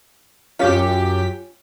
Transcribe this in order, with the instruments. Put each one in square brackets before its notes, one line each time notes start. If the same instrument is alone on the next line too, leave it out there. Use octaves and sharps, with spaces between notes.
[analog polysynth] F#2 G4 B6 [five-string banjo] C#4 F4